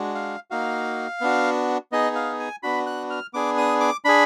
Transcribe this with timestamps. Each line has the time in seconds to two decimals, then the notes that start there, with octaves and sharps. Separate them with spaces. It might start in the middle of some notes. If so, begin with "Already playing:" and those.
Already playing: G#3 D4 F#4
0.15 F5
0.51 A#3 D#4 F#4 F5
1.21 B3 D4 F#4
1.92 B3 D#4 G#4 D#5
2.15 F5
2.39 G#5
2.63 B3 D4 F#4 B5
2.86 F#6
3.10 F6
3.34 B3 D4 G#4 D6
3.58 D#6
3.80 D6
4.05 D4 G#4 B5